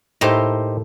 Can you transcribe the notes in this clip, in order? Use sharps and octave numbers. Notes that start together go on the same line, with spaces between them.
A2 A#3 D#4 G4 C5 E5